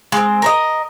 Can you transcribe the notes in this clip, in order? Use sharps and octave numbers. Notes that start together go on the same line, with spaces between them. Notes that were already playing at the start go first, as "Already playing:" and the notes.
G#3 C4
A#4 C#5 D#5